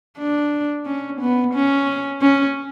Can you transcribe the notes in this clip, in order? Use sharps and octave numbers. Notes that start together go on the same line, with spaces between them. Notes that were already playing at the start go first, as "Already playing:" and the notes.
D4
C#4
B3
C#4
C#4